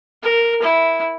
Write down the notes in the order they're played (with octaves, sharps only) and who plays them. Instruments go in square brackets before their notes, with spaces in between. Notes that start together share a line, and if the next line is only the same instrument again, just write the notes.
[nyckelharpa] A#4
E4